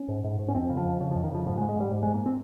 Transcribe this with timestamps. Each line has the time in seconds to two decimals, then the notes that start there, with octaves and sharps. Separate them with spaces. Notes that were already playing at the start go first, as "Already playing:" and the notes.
Already playing: C#4
0.08 G#2
0.24 G#2
0.39 G#2
0.48 C#4
0.55 F2 C4
0.70 C#3
0.77 F3
0.85 F2
1.00 C#3 F3
1.11 F2 F3
1.24 D#3
1.31 C#3 F3
1.46 G#2 F3
1.58 G#3
1.61 G#2
1.69 G#3
1.76 G#2 G3
1.91 G#2
2.03 G#2 G#3
2.14 A#3
2.26 C4